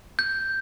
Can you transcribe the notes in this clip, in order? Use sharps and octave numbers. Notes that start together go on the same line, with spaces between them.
G6